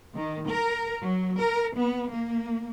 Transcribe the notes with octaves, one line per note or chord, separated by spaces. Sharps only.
D#3
A#4
F#3
A#4
B3
A#3